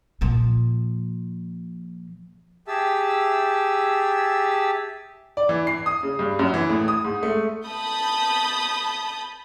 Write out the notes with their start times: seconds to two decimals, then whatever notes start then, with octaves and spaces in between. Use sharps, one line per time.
0.21 A#2 F3
2.68 G4 G#4 E5 A5 E6
5.37 D5
5.49 E3
5.67 C7
5.86 D#6
6.03 C#3
6.19 G2
6.39 F#2
6.54 E3
6.69 A2
6.88 D#6
7.04 G#2
7.23 A3
7.66 A5 B5 D#6 G6